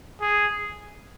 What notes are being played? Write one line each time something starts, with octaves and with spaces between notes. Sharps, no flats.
G#4